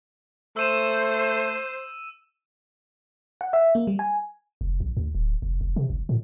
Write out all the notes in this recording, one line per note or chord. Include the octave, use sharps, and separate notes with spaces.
A3 C5 E6 D#7 E7
F#5
E5
A#3
G3
G#5
F1
A#1
D2
D1
F1
F1
C3
G1
A2